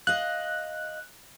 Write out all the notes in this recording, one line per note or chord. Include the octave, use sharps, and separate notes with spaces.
D#5 F5 F#6